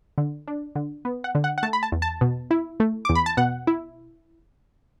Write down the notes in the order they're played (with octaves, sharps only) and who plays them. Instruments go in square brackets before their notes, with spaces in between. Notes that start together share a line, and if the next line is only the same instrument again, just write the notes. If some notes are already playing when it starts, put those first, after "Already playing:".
[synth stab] D3
D4
D3
B3
F#5
D3
F#5
F#5
A3 A5
B5
A5
E2
A5
B2
E4
A3
E2 D6
B5
A5
B2 F#5
E4